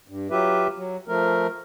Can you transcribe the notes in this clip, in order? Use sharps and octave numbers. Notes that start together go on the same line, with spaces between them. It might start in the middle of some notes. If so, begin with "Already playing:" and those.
G2
F#3 F4 G4 B4 E5
F#3
F3 A3 A#4